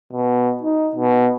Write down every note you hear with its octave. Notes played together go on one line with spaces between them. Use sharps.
B2
D#4
B2